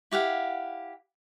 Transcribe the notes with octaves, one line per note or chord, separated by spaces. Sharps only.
E4 G4 F5 F#5